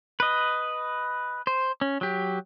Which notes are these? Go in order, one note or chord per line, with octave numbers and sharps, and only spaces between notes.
B4 D#5
C5
C#4
F#3 G4